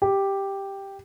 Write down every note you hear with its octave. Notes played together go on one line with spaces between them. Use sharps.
G4